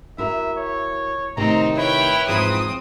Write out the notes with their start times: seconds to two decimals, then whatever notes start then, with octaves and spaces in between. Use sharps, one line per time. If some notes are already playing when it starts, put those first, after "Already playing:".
0.18 E4 F#4 A#4 E5
0.57 C#5
1.37 A2 C3 D#3 C4 D#4 A#5
1.77 E4 B4 C#5 G5
2.27 E2 G#2 F3 C4 D#6